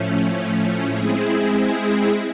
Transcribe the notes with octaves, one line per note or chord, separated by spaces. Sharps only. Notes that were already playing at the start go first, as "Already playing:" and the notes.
Already playing: A2 F3 A3 C#4
G#3 C4 E4 G#4